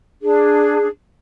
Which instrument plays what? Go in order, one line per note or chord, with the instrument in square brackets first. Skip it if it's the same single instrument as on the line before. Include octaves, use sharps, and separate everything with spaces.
[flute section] D4 G#4